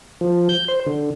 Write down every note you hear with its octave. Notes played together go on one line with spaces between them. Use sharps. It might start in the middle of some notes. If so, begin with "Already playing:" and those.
F3
G6
C5
D3